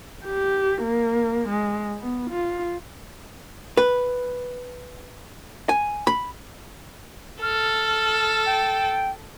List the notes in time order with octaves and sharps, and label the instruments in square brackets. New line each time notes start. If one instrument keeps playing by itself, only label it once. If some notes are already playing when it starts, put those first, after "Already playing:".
[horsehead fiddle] G4
A#3
G#3
B3
F4
[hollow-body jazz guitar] B4
G#5
B5
[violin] A4 [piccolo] F6
[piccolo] G5